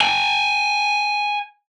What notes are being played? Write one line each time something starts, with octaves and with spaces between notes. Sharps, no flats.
G5 G#5